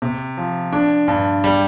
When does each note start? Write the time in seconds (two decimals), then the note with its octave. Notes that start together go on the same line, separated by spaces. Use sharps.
0.02 C3
0.37 F3
0.73 D4
1.08 G2
1.44 G3